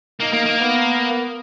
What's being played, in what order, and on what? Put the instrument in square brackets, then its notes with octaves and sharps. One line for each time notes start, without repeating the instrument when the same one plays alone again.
[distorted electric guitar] A#3 [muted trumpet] D#4
[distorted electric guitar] A#3
A#3
[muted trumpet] B3